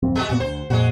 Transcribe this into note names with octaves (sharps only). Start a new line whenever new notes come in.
D1 F2 C4
G#3 A3 F#4
E2 A#2 B3 F#4
D2 C5
F2 A#2 G#3 F#4